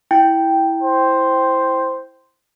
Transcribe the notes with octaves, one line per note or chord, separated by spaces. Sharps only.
E4 G5
C5